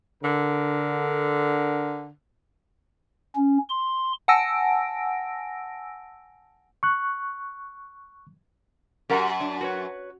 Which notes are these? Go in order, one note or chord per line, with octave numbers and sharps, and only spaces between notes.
D3 A#4
C#4
C6
F#5 G#5 A5 E6 A#6 D7
C#6 F#6
F#2 G4 A#4 F#5
D4
F#4 B4 C#5